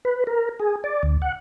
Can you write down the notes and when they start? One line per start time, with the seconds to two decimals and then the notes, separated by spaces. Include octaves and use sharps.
0.05 B4
0.27 A#4
0.60 G#4
0.84 D5
1.03 D2
1.22 F#5